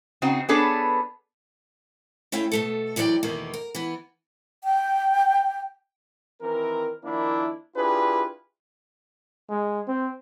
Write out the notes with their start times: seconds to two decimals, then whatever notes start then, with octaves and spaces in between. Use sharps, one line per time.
0.22 C#3 C4 D#4 F#4
0.49 B3 D4 G#4 A4 B4 C#5
2.32 A3 C#4 E4 F5 G5
2.52 B2 A3 A4
2.96 D2 E3 F#3 E4 D5 G5
3.23 E2 B2 D#3 A3 A#3
3.54 A#4
3.75 E3 B3
4.64 G5
6.42 D#3 E3 C4 A#4
7.04 D#3 F3 A#3 D4 E4
7.76 D4 E4 F4 G4 G#4 B4
9.49 G#3
9.88 C4